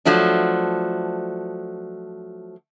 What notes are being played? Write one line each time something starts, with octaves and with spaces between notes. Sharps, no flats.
F3 F#3 A3 D4